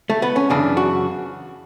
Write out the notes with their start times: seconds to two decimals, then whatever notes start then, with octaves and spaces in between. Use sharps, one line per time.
0.10 A3
0.22 B3
0.36 C#4
0.50 F#2 C#3 E3 D4
0.77 F#4